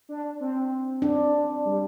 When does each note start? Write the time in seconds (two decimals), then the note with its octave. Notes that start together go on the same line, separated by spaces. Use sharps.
0.09 D4
0.40 C4
1.02 D4
1.65 G3